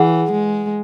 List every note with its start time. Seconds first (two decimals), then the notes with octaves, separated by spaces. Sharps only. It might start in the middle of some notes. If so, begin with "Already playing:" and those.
Already playing: E3 G#4 B4 F#5
0.31 G#3